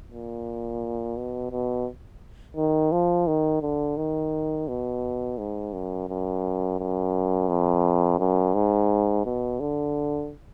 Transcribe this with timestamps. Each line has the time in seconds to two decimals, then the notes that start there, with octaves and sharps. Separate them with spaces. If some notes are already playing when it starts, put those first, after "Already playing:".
0.11 A#2
1.17 B2
1.51 B2
2.56 D#3
2.92 F3
3.28 D#3
3.62 D3
3.97 D#3
4.68 B2
5.38 G#2
5.73 F#2
6.09 F#2
6.79 F#2
7.49 F2
8.19 F#2
8.54 G#2
9.25 B2
9.60 D3